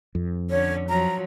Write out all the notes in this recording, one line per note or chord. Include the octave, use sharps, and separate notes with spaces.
F2
D3 C#4 C#5
F3 F#3 A#5